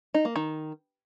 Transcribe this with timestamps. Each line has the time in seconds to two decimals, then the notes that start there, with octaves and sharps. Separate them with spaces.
0.14 D#4
0.25 A#3
0.36 D#3